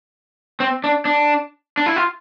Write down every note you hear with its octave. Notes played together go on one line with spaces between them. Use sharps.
C4
D4
D4
D4
E4
F4